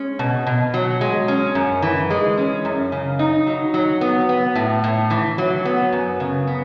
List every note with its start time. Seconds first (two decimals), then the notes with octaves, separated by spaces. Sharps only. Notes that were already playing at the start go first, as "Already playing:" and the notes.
Already playing: G#3 C#4
0.19 B2
0.47 B2
0.74 F#3
1.01 G#3
1.28 C#4
1.55 F#2
1.82 E3
2.10 G#3
2.37 C#4
2.65 F#2
2.92 C#3
3.19 D#4
3.47 F#3
3.74 F#3
4.01 B3
4.29 B3
4.55 A2
4.84 A2
5.10 E3
5.38 F#3
5.65 B3
5.93 F#2
6.20 C#3
6.47 B3